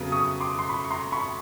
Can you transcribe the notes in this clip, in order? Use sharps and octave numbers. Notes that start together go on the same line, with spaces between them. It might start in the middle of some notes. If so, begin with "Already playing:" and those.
Already playing: F2 C#3 F#3 B3 D#6
C#6 D#6
C6 D6
C6
B5 C#6
C#6
A#5 C6
B5 C#6